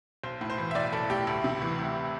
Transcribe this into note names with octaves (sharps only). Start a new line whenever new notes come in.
B1 C5
A2
C5
E3
E5
B1 D5
B1 A4
A2 G4
D2
C3
E3
D2